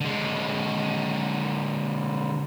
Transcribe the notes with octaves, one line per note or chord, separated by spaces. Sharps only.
D3 G#3